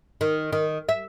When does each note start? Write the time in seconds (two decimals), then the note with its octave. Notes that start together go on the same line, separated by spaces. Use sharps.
0.21 D#3
0.52 D#3
0.89 E5